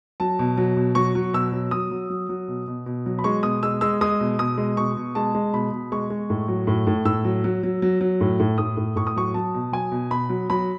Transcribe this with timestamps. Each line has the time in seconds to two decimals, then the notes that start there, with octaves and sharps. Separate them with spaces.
0.20 F#3 A5
0.39 B2
0.57 F#3
0.76 B2
0.95 F#3 C#6
1.15 F#3
1.33 B2 E6
1.52 F#3
1.71 F#3 D#6
1.91 F#3
2.10 F#3
2.29 F#3
2.48 B2
2.67 B2
2.86 B2
3.06 F#3
3.19 B5
3.24 G#3 C#6
3.43 B2 D#6
3.63 G#3 E6
3.81 G#3 E6
4.01 G#3 D#6
4.20 B2
4.38 B2 D#6
4.58 G#3
4.77 B2 C#6
4.97 B2
5.15 G#3 A5
5.35 G#3
5.53 B2 B5
5.72 B2
5.92 G#3 C#6
6.10 G#3
6.30 A2
6.48 F#3
6.67 A2
6.87 A2
7.05 A2 E6
7.24 F#3
7.44 F#3
7.63 F#3
7.82 F#3
8.01 F#3
8.21 A2
8.40 A2
8.58 A2 D#6
8.77 A2
8.96 A2 C#6
9.07 D#6
9.16 F#3 C#6
9.34 F#3 A5
9.54 B2
9.72 F#3 G#5
9.92 B2
10.10 B2 B5
10.29 F#3
10.50 F#3 B5